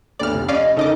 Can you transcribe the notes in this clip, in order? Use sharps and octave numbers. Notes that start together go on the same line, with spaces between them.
G1 D2 A3 D5 F6
F1
C#4 D5 D#5 F5
C#3 C#4 D#4 A4 A#4 D#5 D6